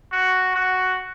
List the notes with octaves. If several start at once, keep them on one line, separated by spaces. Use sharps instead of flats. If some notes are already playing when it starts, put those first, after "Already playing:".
F#4
F#4